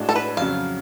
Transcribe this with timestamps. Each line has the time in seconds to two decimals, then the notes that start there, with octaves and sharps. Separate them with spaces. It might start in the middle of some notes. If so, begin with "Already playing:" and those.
Already playing: A2 G#3 D4 F#4
0.09 A4
0.16 B4
0.37 F2 C#3 F#3 F5